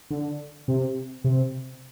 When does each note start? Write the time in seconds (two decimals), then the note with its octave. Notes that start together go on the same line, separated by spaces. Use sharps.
0.11 D3
0.68 C3
1.24 C3